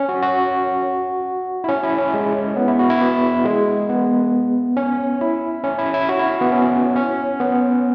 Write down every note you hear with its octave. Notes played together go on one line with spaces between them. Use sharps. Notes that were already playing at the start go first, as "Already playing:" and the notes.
Already playing: C#4
F#4
F#4
E4
C#4
E4
C#4
G#3
B3
E4
F#4
E4
B3
G#3
B3
C#4
E4
C#4
E4
E4
F#4
E4
B3
C#4
C#4
B3